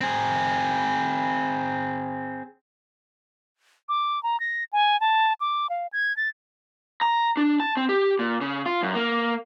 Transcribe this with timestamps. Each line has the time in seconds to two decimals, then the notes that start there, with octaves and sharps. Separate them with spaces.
0.01 C4 G#4
3.89 D6
4.23 A#5
4.40 A#6
4.73 G#5
5.01 A5
5.41 D6
5.70 F5
5.93 G#6
6.17 A6
7.01 A#5
7.37 D4
7.60 A5
7.77 C4
7.89 G4
8.19 A#2
8.41 C#3
8.66 F4
8.83 F#2
8.95 A#3